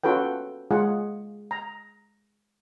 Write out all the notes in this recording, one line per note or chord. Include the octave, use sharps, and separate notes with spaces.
C#4 F4 F#4 A4 B4 G5
G#3 F4 G#4 F#5
A#5